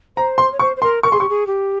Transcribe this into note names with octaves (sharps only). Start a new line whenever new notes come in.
C5 A#5
C6
C#5
C5 C#6
C5
A#4 C6
A#4 C#6
G#4 C6
G4 C#6
G#4
G4